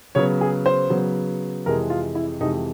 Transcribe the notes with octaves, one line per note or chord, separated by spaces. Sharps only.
C#3 F#3 B3 C#5
G#4
C5
C#3 F#3 B3
F2 C3 E3 G#3 A#4
F4
E4
F2 C3 E3 G#3 D#4